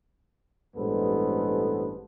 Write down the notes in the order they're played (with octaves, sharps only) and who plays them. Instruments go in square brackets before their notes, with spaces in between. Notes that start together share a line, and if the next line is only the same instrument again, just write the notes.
[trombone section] A1 G2 G#3 B3 A4 C5